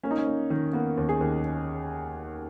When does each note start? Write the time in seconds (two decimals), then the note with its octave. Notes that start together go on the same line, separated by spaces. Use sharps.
0.03 A#3 C#4
0.11 D#4
0.18 C#4
0.26 A#3
0.50 D#3
0.73 A#3 B3
0.97 D#2
1.09 G#4
1.21 D#2